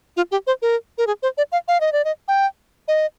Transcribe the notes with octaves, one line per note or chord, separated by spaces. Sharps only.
F4
G4
C5
A#4
A#4
G#4
C5
D5
F5
F5
D#5
D5
D#5
G5
D#5